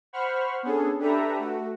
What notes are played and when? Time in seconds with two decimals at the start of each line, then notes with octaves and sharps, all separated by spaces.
0.13 C5 F#5 B5 C#6 F6
0.63 B3 C#4 D4 G#4 A4
0.99 D4 G4 A4 B4 E5 A#5
1.39 A3 F#4